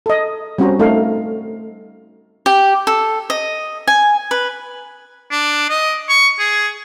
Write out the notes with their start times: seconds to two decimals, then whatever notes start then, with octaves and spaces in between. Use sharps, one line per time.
0.06 A4 D#5
0.58 G3 C4 C#4 F#4 C5 A#5
0.79 A3 D#4 A4 A#4 F5
2.46 G4
2.87 A4
3.30 D#5
3.87 G#5
4.31 B4
5.31 D4
5.69 D#5
6.09 C#6
6.39 G#4